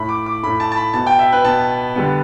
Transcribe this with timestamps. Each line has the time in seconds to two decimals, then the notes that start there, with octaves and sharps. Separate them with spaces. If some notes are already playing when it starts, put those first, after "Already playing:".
Already playing: A2 A3 B5
0.09 D6
0.26 D6
0.43 A2 A3 B5
0.60 A5
0.72 A5
0.76 B5
0.93 B2 B3 A5
1.06 G5
1.19 E5
1.33 B4
1.44 B2 B3 A5
1.96 D3 G3 B3